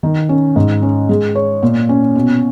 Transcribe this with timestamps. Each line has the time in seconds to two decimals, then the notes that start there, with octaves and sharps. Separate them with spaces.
0.03 D#3
0.29 C#4
0.56 G#2
0.82 C#4
1.09 G#3
1.35 C#5
1.63 A#2
1.89 C#4
2.15 B2